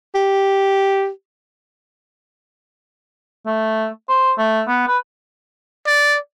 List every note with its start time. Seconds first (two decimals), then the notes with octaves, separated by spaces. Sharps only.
0.15 G4
3.47 A3
4.09 C5
4.38 A3
4.68 B3
4.88 B4
5.87 D5